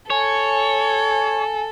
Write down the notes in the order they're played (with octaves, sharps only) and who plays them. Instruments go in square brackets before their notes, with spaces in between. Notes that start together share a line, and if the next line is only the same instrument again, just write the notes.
[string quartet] A4 [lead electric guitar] C#5 [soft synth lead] G#5